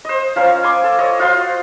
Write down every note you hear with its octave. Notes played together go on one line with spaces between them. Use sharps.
C5 D#5
F3 C#4 A#4
G#5 C6 D6
A4
C#5 D#5
F4 F#4 C5 C6